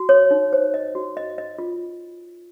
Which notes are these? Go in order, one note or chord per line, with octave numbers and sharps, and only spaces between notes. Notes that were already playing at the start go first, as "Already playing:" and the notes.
Already playing: F#4
C#5
D#4
C5
D#5
F#4
D#5
D#5
F4